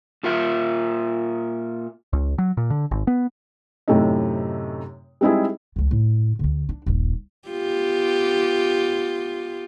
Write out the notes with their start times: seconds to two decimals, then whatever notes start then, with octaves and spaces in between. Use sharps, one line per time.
0.23 A#2 F4 A#4 E5
2.13 C#2
2.38 F#3
2.57 A#2
2.70 D3
2.91 G#1
3.07 B3
3.88 F#2 A2 C3 A3 C4 D#4
5.21 G3 G#3 C4 D#4 E4 G#4
5.76 C#2 E3
5.91 A2
6.39 D2 D3
6.69 D4
6.86 D#1 A#1
7.49 B3 F4 G4